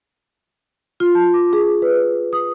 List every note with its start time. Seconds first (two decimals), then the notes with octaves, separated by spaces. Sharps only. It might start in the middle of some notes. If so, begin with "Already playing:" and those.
1.00 F4
1.15 A5
1.34 D6
1.53 G#4
1.82 B4
2.33 D#6